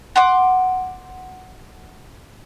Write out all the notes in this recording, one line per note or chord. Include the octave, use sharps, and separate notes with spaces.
F#5 C6 D6